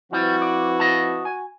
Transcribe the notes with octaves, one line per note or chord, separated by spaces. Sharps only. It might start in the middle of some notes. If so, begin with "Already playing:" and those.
F3 G3 C4 E4 F#4 B4
D5
D#5 A5
G#5